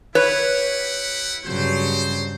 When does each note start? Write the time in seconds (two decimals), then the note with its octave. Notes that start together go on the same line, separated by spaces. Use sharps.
0.15 E4 G4 B4 C#5 F#5
1.45 G2 C#3 F#3 C5